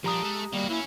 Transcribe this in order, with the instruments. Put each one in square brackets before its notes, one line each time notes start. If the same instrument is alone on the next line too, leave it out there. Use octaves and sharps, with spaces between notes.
[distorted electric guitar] A#2 D4 [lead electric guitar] F3 G3 [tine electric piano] G4 A#5 D#6
[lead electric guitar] G#3 [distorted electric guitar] A3 A4
[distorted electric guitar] D#3 F#4 [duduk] G3 [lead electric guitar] A#3
[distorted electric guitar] F#3 C#4 [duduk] E4